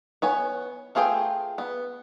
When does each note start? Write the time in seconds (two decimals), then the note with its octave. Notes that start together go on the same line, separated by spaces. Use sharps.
0.22 B3 C#5 G#5
0.95 A3 F4 G#4 C#5 G5
1.58 B3